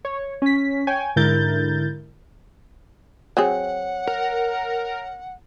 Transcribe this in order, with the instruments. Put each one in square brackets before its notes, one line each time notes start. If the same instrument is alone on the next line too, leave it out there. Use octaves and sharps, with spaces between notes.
[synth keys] C#5
C#4 B6
C#5 G5 G#5
G#2 D3 E4 A#4 G6 A6
[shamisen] F#3 C4 G#4 [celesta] C#5 [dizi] F#5
[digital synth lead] A#4